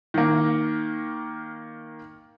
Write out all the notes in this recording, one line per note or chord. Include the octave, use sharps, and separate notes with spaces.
D#3 A#3